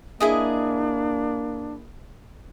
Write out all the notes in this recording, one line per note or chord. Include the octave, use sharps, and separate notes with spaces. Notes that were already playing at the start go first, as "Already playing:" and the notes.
A#3 D4 E4 G#4 D#5